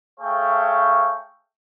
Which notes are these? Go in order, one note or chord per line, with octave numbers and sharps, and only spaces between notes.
A3 G#4 C#5 F5 G5